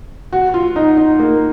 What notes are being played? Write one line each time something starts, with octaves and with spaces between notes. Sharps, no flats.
F#4
F4
D#4
D#4
A#3